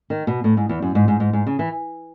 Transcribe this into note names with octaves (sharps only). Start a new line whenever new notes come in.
D#3
B2
A2
G#2
E2
F#2
G#2
G#2
G#2
G#2
C#3
E3